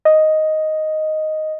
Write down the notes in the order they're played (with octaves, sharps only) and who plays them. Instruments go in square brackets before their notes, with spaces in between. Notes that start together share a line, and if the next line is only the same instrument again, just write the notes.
[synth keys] D#5